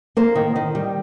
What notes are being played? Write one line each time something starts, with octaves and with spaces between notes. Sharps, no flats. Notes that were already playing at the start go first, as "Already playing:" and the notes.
A#3 C5
D#3
D#3
G3